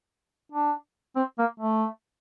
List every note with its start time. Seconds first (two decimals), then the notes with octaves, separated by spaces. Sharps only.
0.52 D4
1.16 C4
1.38 A#3
1.60 A3